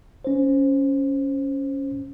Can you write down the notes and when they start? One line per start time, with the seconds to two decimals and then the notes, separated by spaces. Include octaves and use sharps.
0.25 C#4 C5